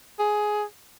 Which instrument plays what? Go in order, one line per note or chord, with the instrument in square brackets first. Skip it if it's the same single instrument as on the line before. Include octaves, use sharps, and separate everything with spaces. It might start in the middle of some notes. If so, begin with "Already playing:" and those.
[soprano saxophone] G#4